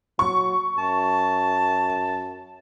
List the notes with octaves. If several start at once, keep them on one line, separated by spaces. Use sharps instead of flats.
F#3 C#6
F#2 A5